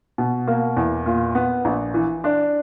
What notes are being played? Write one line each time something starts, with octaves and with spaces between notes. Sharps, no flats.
B2
A#3
E2
A#2
B3
A#1
E3
D4